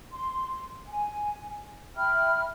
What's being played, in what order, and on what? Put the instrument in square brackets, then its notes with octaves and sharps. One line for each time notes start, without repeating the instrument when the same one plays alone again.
[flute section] C6
G#5
E5 G5 B5 F6